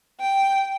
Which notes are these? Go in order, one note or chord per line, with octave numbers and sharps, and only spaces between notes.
G5